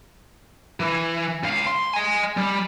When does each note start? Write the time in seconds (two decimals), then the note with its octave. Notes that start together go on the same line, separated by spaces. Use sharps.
0.80 E3
1.44 C#2 F5
1.67 C6
1.94 D#5 G#5
2.37 G3